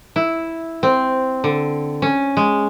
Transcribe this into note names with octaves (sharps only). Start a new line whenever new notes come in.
E4
C4
D3
C#4
G#3